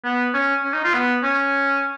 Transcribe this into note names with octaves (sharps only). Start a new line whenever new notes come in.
B3
C#4
C#4
D#4
F4
B3
C#4